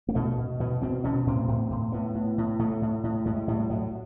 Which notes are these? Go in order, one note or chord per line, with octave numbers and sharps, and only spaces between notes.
A#3
B2 A3
B2
B2 B3
B2 C4
B2 C#4
A2 C4
A2
A2
A2 B3
A2
A2
A2 A3
A2
A2
A2 G#3
A2 G3
A2 F#3